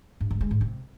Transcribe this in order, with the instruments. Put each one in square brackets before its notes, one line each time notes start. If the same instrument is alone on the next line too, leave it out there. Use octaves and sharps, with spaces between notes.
[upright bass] G2
G2
G#3
G#2
C3